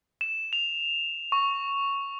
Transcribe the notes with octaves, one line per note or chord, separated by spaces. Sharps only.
E7
F7
C#6